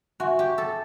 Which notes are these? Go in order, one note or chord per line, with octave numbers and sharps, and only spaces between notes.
F#4 E5 G#5 C6
G4
A4